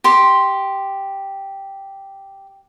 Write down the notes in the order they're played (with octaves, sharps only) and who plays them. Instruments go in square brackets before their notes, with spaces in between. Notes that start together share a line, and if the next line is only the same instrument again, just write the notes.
[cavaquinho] G4 C6 D6